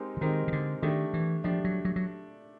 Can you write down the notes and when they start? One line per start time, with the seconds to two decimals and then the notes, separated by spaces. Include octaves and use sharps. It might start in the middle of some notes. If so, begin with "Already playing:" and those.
Already playing: G#3 C4 D#4 G4 A#4
0.17 E3
0.21 D#3 G#3 C4 D#4 G4 A#4
0.48 D#3
0.52 D3
0.82 D#3 A3 D4 G4
1.14 E3
1.44 F3 A3 D4 G4
1.65 F#3
1.85 F#3
1.96 F#3